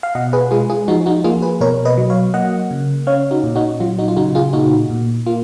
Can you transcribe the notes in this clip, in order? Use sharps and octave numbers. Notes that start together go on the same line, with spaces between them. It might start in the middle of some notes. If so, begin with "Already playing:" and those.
F5
B2 D#5 F#5
G#4 B4
G#3 F4 G#4
F4 G#4
F3 D#4 F#4
D#4 F#4
A#3 F4 G#4
G#4 B4
B2 A#4 C#5
B4 D#5
F#3
C#5 F5
A#3 D#5 F#5
C#3
C#4 C#5 F5
D#4 F#4
A#2
D#4 F#4
F#3 F4
D#4 F#4
F4
C#3 D#4 F#4
F4 G#4
A#2 D#4 F#4
A#2
A#3 F4